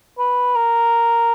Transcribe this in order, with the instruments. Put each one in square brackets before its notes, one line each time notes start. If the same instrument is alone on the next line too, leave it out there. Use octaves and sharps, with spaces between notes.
[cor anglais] B4
A#4